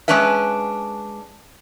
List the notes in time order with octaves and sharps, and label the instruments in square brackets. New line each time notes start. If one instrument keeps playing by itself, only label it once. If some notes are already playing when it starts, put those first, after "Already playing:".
[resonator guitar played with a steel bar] G#3 A3 C#4 D4 B4 E5